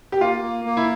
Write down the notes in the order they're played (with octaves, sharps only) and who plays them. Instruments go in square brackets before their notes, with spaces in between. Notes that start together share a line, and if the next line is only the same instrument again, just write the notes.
[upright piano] G4
[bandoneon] A#3 [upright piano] F4
[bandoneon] A#3
A#3
[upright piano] E4